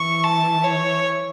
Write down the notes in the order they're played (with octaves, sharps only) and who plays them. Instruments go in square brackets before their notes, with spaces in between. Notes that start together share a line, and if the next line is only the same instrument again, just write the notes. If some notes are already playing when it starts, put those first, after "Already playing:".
Already playing: [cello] E3 [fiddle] C#6
[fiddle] A5
C#5